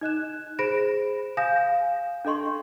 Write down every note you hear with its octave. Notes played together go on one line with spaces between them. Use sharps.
D#4 D#5 F#6 E7
G#4 C5 B5 A#6 D7 E7
F5 G#5 D#6 G6 A#6 E7
F5
D4 A4 D#5 C6 C#6